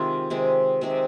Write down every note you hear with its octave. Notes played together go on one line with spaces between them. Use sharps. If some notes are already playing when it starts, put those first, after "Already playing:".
Already playing: C3 D#3 G#3 C4 F4
C3 D#3 G#3 C4
C3 D#3 G#3 C4